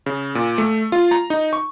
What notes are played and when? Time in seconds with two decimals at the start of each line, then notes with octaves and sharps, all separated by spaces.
0.06 C#3
0.35 A#2
0.58 A3
0.92 F4
1.11 A#5
1.30 D#4
1.53 C#6